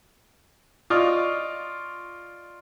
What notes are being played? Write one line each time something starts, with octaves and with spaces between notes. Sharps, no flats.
F4 D5 D#5 C#6 D#6 F6